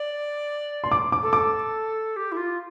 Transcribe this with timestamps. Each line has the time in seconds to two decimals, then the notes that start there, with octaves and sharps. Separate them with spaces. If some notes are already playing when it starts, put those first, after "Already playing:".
Already playing: D5
0.84 C6
0.92 D6
1.12 D6
1.23 A4
1.33 D6
2.16 G4
2.32 E4
2.37 F4